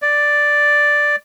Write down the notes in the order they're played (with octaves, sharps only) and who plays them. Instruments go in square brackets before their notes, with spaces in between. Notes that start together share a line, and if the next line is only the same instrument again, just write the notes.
[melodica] D5